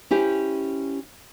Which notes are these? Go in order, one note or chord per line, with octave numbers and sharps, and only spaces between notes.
C#4 E4 G4 C5